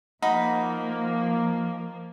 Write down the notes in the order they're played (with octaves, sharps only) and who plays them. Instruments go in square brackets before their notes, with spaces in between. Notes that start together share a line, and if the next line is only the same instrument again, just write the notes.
[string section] F3 A#3 [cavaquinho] D#4 F#4 B5